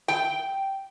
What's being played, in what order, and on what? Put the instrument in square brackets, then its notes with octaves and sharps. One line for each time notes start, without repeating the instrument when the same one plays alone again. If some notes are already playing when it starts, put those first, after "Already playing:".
[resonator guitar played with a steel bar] G5